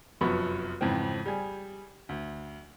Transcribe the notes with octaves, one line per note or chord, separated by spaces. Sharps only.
F1 F#2 F3 B3 B5 C#6
F2 G#2 C#3 E3 C4
G3 G#4
D2